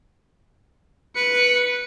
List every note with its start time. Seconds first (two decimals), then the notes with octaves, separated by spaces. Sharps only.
1.16 B4 C#7